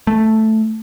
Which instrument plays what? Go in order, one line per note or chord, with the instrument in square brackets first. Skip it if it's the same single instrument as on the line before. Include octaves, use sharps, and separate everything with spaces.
[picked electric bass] A3